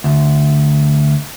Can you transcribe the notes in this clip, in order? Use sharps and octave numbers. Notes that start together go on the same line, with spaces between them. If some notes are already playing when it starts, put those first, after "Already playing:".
D2